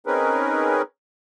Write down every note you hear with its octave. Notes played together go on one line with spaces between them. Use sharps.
C4 C#4 D#4 G#4 A#4 B4